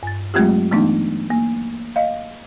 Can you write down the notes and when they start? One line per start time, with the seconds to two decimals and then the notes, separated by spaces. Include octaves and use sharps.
0.03 G2 A6
0.34 F#3 G#3 A3 C4 F4 G4
0.71 E3 A3 B3 D4 D#4
1.30 A#3
1.96 D#5 F5